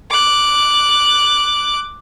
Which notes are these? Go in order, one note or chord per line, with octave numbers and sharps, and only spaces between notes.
D6 F#6